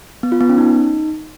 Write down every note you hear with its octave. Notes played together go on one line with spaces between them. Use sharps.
B3
F4
B3
C#4
D#4